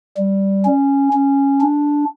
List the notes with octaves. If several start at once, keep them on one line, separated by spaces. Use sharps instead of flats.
G3
C#4
C#4
D4